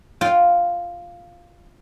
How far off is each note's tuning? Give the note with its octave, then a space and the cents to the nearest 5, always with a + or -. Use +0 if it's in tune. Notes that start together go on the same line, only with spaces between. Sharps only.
F4 +0 G5 -15